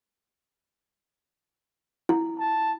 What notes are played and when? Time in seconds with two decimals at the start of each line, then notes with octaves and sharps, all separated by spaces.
2.09 E4
2.39 A5